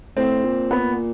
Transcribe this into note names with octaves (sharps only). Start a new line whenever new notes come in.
A2 C4
A#2
B3